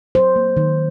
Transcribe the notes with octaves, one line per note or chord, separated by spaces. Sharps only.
F#3 C5
A#3
D#3